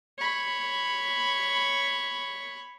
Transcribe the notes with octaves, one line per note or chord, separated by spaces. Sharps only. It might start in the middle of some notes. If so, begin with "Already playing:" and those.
C#5 B5